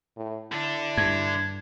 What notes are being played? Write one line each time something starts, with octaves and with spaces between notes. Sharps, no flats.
A2
D3 D4 E4
G2 G#6